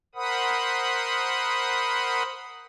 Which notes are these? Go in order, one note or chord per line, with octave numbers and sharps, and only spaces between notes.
A#4 C5 F#5 B5 D#6